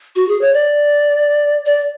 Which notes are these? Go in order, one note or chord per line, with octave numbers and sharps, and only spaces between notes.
F#4
G#4
C#5
D5
D5